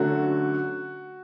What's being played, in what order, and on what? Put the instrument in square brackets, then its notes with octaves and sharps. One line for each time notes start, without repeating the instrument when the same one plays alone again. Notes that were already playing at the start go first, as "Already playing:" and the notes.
Already playing: [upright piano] D3 F#3 A3 C#4 F#4